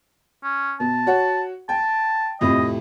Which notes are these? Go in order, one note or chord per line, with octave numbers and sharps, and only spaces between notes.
C#4
B2 A5
F#4 C#5 F#5
G5 A5
F2 A2 C3 D#5